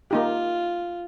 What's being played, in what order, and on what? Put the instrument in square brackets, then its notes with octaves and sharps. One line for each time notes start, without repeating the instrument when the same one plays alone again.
[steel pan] A#3 D#4 G4 [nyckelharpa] F4